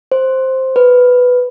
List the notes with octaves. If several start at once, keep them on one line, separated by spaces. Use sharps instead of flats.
C5
B4